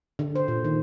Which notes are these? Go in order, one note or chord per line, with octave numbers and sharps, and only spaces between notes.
D3
C5
A#2
D#3